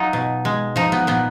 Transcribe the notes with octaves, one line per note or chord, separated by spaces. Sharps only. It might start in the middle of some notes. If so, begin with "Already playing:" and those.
Already playing: F#3 D#4 F4
B2
G#3
F3 D#4
B3
A#2 B3